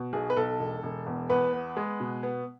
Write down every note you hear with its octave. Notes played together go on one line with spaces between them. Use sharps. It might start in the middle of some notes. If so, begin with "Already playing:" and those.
Already playing: B2
B1 G#4
B4
B1 A4
E1
E1
E2
E2 B3 B4
B3
G#3
B2
B3